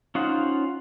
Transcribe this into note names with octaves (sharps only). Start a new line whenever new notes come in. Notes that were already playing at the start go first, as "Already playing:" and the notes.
C#4 D#4 F4 C5 F#5